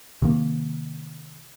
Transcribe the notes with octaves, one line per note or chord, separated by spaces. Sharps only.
C3 D#3 A#3